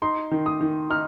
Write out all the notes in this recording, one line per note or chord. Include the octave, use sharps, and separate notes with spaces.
D#4 C6
D#3
D#6
D#3
D#4 F6